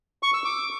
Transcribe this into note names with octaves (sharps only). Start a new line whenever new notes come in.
C#6
E6
D6